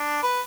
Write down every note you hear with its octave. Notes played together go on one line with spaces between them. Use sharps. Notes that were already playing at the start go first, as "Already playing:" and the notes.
Already playing: D4
B4